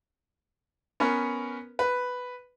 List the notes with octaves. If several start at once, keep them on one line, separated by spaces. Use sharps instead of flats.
B3 C#4 A#4 B4
B4